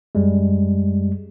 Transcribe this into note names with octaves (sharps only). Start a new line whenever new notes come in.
F#2 G3 G#3